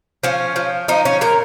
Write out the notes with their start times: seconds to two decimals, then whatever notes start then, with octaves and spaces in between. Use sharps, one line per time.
0.23 F3 C#4
0.56 F3
0.88 F3 D#4
1.05 C#4
1.21 A#2 A#4